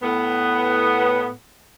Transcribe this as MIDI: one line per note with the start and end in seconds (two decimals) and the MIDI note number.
0.03 1.29 45
0.03 1.29 59